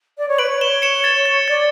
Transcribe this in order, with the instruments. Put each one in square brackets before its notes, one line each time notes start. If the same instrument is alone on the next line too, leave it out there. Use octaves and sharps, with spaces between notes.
[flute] D5
C#5
[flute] B4 [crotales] D7 F#7
[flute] C#5
[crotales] E7 G7
C#7 E7
A6 C#7
A6
[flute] D5 [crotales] A6